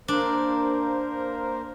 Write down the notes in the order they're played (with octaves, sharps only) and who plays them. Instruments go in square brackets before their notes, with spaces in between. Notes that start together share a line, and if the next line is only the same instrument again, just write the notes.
[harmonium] A#3 A#4 C5 [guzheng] D4